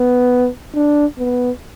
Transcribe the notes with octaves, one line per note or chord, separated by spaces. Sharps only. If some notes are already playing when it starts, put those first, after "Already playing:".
Already playing: B3
D4
B3